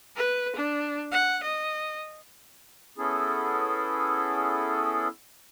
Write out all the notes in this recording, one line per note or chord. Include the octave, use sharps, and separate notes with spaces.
B4
D4
F#5
D#5
B3 C#4 E4 G#4 A4